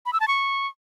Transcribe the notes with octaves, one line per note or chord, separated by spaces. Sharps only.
B5
E6
A5
C#6